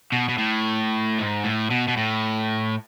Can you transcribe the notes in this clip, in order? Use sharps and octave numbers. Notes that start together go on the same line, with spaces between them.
B2
B2
A2
G#2
A2
B2
B2
A2